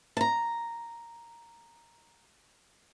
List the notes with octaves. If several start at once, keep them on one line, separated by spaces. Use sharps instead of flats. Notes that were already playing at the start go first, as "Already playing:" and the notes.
A5 A#5